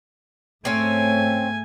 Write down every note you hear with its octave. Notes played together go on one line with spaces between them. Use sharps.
G#2 A3 C4 C#4 G#5